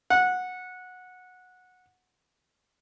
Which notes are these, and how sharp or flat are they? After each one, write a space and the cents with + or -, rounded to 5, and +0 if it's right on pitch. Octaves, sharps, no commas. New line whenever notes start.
F#5 -15